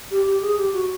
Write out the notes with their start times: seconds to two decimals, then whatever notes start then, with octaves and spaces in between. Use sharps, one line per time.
0.11 G4
0.27 G4
0.42 G#4
0.57 G4
0.73 F#4